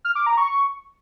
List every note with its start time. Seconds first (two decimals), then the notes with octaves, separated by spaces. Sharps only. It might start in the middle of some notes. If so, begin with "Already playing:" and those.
0.05 F6
0.15 D6
0.26 A#5
0.37 C#6